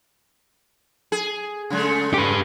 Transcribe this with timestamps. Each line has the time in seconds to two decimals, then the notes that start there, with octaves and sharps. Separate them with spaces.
1.12 G#4
1.70 C#3 G#3 A3
2.14 G4 B4